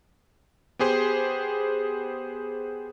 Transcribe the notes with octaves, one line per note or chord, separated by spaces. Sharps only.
B3 G4 G#4 C5